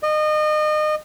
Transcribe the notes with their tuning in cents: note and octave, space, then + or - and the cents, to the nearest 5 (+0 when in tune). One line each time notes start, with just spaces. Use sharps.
D#5 -30